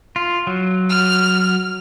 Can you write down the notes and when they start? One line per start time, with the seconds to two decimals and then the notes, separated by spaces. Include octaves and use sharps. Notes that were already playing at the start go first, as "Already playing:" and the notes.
0.16 F4
0.47 F#3
0.90 F6